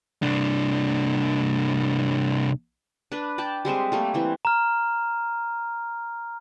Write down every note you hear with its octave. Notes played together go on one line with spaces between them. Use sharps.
C2 D4
D4 B4
D5 G5 A5
G3 G#3 C4 E5
G3 A3 A#3
E3 C4
A#5 F6